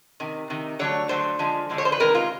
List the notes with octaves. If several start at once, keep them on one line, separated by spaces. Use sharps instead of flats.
C3 D#3
C3 D#3
D3 F#3 A3 C#5
D3 F#3 A3 C5
D3 F3 G#3
D3 F3 G#3
C#5
C5
B4
C3 D#3 G#3 A#4
F4